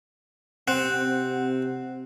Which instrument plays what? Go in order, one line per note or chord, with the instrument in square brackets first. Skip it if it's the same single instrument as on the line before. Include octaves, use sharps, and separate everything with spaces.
[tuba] C3 [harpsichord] C4 [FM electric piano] F#5